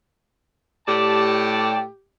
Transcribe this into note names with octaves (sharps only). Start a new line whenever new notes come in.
A2 G4 D5 A5